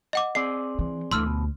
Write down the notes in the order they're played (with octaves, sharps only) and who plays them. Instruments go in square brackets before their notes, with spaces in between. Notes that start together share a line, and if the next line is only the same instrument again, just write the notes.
[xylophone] D#5 F#5 D6
[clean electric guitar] C4 G#4 D5 [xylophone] C7
[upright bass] E3
[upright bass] D2 [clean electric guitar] D3 E3 A3 [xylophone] C6 E6 F6
[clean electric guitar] B2